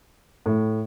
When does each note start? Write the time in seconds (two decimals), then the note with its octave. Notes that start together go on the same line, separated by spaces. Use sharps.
0.46 A2